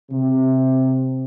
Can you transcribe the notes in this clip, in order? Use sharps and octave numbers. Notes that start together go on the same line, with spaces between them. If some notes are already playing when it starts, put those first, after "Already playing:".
C3